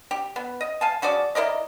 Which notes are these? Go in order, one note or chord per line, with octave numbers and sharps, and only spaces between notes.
G4
B3
D#5
F5 G#5 A5
F3 F#4 G#4 D5
E4 A#4 D5 D#5